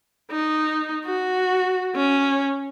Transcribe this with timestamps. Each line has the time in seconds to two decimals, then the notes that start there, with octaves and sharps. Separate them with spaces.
0.31 D#4
1.05 F#4
1.96 C#4